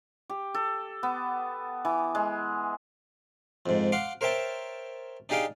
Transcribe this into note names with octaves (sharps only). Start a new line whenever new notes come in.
G4
A4
B3
E3
G#3
F2 G#2
F5 F#5 C6 D6
A#4 C5 C#5 E5 G5 A5
D4 D#4 G4 G#4 F5 G5